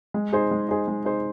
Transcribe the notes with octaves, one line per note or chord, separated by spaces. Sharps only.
G#3
D#4 G#4 C5
G#3
D#4 G#4 C5
G#3
D#4 G#4 C5